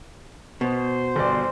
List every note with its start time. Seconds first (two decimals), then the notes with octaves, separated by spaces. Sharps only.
0.61 B2 C5
1.16 G1 D5